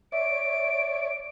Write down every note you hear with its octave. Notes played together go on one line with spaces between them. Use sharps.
C#5 D5 E5 D7